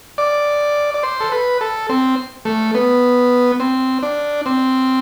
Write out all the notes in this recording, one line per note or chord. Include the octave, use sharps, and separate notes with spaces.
D5
D5
C5
A4
B4
A4
C4
A3
B3
C4
D4
C4